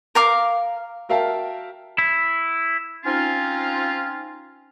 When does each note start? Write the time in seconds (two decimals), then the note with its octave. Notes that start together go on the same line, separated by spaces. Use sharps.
0.15 A#4 F5 D6
1.09 F#4 A#4 E5 F5 G5 A5
1.98 E4
3.04 C4 C#4 D#4 F4